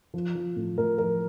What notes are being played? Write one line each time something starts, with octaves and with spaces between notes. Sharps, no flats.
F3
F3
A2
A2 A#4
F3 A#4